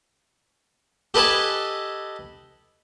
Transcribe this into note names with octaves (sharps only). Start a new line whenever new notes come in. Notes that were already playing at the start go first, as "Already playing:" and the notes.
G4 A4 B4 D#5 G#5 A5